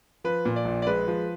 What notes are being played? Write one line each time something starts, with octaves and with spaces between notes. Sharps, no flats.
F3 B4
A#2
D5
A#1
D5
G#3 B4
F3